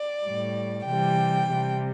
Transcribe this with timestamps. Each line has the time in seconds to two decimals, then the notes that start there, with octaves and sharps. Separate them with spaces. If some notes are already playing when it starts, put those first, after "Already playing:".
Already playing: D5
0.24 A2 G3
0.87 C3 E3 G3 G5
1.51 C3 G3